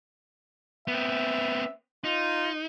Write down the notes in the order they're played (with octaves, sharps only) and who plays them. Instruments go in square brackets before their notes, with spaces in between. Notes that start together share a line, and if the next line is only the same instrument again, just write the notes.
[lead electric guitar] B3 C4 [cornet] E5
[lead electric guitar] D#4 [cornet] F4